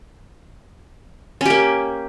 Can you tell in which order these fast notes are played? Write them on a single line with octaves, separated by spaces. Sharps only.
C#4 G4 A#3